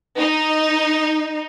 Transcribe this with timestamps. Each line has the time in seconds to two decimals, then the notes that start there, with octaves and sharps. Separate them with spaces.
0.19 D#4